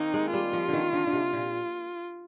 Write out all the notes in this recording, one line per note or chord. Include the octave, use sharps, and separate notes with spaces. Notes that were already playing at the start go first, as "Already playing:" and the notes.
Already playing: D#3 A#3 C4 D#4
G#3
G3 F4
F3
D3
D#3
D3
D3
C3
A#2